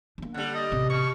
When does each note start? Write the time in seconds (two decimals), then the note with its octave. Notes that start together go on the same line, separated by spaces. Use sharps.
0.18 A#3 D4
0.34 D3 G3 F#5
0.54 D#5
0.72 A1 C3
0.90 B2 C#6